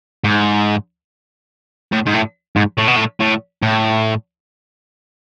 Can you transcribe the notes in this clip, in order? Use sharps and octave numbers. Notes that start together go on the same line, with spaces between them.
G#2
A2
G#2
A2
G#2
A2
B2
A2
A2
A2